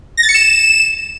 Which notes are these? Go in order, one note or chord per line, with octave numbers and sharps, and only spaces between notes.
A#6
A6
C#7
E7